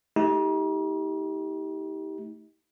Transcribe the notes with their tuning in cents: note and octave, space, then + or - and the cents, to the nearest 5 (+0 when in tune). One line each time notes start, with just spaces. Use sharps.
A3 +0 D#4 +40 G4 +0